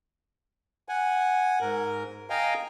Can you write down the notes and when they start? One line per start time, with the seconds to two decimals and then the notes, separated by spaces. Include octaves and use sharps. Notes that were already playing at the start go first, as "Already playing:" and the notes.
0.89 F#5 G#5
1.61 G#2 A#4
2.30 D#5 F5 G5 G#5 A#5